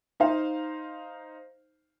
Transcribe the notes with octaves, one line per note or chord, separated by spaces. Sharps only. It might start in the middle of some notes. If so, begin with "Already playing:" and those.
D#4 C5 F5